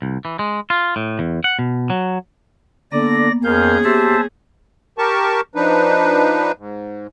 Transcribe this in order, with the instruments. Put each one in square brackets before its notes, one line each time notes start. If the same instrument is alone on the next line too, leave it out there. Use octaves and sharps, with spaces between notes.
[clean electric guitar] C2
E3
G#3
F4
A2
E2
F#5
B2
F#3
[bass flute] D3 [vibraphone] A#3 B3 [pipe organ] D5 A#6
[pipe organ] F2 F5 G6 [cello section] C#4 G#4 [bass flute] A#4
[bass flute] G4 [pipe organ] C5 E5 A5
[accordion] G4 A#4 A5 C#6
F3 D4 D#4 B4
G#2